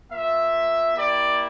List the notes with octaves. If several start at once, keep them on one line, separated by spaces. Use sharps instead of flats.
A#3 F4 E5
A#3 E4 G4 D5